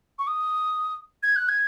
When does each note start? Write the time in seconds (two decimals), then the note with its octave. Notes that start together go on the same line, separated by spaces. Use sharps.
0.19 C#6
0.27 D#6
1.23 G#6
1.36 F#6
1.49 G#6